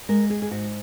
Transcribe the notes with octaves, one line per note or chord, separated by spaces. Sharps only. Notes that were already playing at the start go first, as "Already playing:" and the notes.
G#3 A#4
G#4
G#4
G#2 F#4